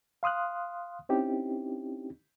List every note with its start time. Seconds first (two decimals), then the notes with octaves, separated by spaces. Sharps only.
0.23 F5 C6 D#6 F6 F#6
1.09 C4 C#4 D#4 E4 G4